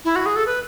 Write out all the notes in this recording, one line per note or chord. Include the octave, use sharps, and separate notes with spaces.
E4
F#4
G#4
A4
B4